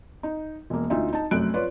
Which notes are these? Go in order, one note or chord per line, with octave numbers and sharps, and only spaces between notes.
D#4
E1 A#3
D2 D#4 F4 E5
D#4 A5
F1 F#2 A3 F#6 D7
F4 B4 C#5 D5